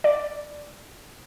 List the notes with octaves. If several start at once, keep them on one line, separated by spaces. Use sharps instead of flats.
D5